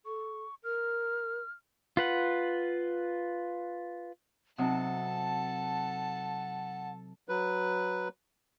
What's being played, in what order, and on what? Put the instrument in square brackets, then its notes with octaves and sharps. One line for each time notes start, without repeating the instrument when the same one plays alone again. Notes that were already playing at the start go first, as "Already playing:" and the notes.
[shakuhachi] A4 [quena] C#6
[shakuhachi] A#4 [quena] F6
[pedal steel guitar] F4 B4 F#5
[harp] C3 F#3 D#4 [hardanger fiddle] A4 A5 [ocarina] F#5
[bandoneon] F#3 B4